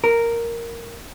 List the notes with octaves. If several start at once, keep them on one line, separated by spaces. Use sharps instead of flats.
A#4